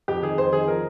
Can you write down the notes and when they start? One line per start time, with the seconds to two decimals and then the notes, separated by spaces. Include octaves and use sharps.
0.08 F2 G4
0.22 D#3 G#4
0.38 F2 C5
0.53 D#3 G#4
0.68 F3 A#4